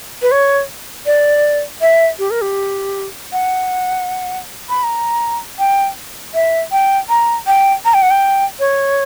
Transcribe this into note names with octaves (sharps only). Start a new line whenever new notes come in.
B4
C#5
D5
E5
G4
A#4
G4
F#5
B5
A#5
G5
E5
G5
A#5
G5
A#5
G5
F#5
G5
C#5